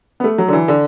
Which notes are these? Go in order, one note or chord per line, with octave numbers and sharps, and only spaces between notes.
B3
A3
F#3
D3
E3
D3